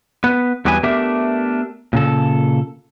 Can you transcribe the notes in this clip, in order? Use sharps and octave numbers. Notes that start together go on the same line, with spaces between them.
B3 B4
E2 F#3 G3 B3 B4 G#5
A3 B3 D4 G4 A#4 E5
A#2 C#3 A4